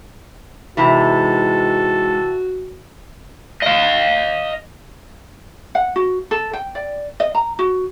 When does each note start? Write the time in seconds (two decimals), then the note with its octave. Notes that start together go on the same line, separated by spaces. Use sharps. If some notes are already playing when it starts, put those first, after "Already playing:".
0.77 G#2 C3 E3 G#3 F#4 A4
3.62 D#5 F5
5.75 F#5
5.96 F#4
6.31 A4
6.53 G5
6.75 D5
7.20 D#5
7.35 A#5
7.59 F#4